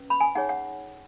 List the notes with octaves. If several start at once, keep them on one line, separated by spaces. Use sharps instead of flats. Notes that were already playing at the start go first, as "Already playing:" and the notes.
Already playing: C#4 B4
B5
G#5
D#4 G#4 C#5 F#5
F#5